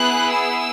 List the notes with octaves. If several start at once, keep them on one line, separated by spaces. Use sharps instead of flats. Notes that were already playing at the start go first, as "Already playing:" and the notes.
Already playing: B3 E4 G#4 F#6
E6